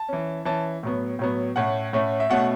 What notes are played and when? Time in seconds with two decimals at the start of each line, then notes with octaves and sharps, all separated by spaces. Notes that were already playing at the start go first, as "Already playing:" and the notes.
Already playing: A5
0.09 E3 C#4
0.45 E3 C#4 A5
0.83 A2 F#3 B3
1.19 A2 F#3 B3
1.56 A2 A3 C#4 F#5
1.93 A2 A3 C#4
2.20 E5
2.30 B2 A3 C#4 F#5